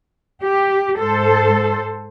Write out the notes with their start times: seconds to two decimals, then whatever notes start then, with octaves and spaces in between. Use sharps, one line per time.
0.42 G4
0.98 G#2 A4 C5